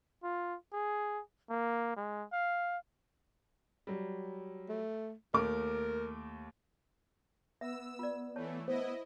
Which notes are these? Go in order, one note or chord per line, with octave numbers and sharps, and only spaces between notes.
F4
G#4
A#3
G#3
F5
F#3 G3
A3
D#2 A3 A#4 D6
B3 E5 E6
F4 D5
E3 A3 C#5 A5
B3 E4 C5 D#5